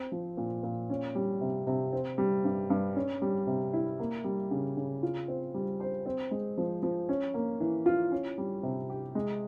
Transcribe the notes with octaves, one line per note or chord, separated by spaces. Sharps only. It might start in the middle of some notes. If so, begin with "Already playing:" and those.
Already playing: C4
F3
A#2
A#2
C#4
G3
C3
C3
C4
G3
G2
G2
C#4
G3
C3
E4
A#3
G3
C#3
C#3
F4
C4
G3
C5
C4
G#3
F3
F3
C#4
A#3
E3
F4
C#4
G3
C3
G4
G#3